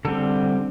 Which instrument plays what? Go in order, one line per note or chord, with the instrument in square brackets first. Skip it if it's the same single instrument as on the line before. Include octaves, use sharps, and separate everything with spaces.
[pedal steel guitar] D3 G3 C4 A4